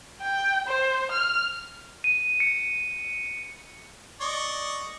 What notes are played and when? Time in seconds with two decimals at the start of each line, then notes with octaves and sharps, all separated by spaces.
0.21 G5
0.68 C5
1.12 F6
2.04 D#7
2.40 C#7
4.21 D5 D#5 C#6